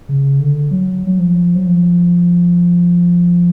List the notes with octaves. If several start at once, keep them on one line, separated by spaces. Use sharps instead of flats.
C#3
D3
F#3
F#3
F3
F#3
F3